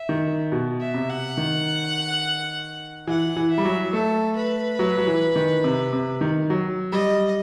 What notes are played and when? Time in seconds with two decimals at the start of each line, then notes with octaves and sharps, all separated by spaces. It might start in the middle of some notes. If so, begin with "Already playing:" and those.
Already playing: E5
0.09 D#3
0.52 B2
0.81 E5
0.94 C3
1.09 F#5
1.37 D#3
3.07 E3 F#5
3.36 E3
3.51 E5
3.58 G3
3.65 F#3
3.93 A3 A4
4.36 B4
4.79 F#3
4.98 F#3
5.07 E3
5.36 D#3
5.64 C3
5.93 C3
6.21 D#3
6.50 F#3
6.92 G3 D#5